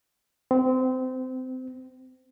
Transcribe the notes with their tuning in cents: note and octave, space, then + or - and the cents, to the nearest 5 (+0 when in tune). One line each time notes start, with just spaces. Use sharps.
C4 -25